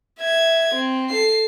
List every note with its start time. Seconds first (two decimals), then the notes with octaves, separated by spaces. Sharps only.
0.19 E5 G#6
0.74 C4
1.10 A4 C7